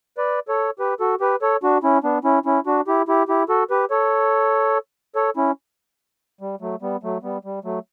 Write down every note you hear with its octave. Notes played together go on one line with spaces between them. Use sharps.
B4 D5
A4 C#5
G4 B4
F#4 A4
G4 B4
A4 C#5
D4 F#4
C#4 E4
B3 D4
C#4 E4
C#4 E4
D4 F#4
E4 G4
E4 G4
E4 G4
F#4 A4
G4 B4
A4 C#5
A4 C#5
C#4 E4
G3
F#3 A3
G3 B3
F#3 A3
G3 B3
G3
F#3 A3